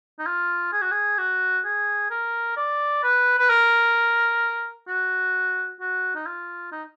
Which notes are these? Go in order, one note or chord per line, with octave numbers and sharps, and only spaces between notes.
D#4
F4
G#4
F#4
G#4
F#4
G#4
A#4
D5
B4
B4
A#4
F#4
F#4
D#4
F4
D#4